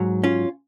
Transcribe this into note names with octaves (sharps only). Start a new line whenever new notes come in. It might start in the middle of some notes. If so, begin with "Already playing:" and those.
Already playing: G#2 F#3
C#4 F4